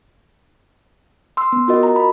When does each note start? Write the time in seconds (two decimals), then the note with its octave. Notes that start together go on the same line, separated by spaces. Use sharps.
1.37 C6 E6
1.53 B3
1.68 F4 F#4 A#4 D#5
1.83 A#5
1.96 B5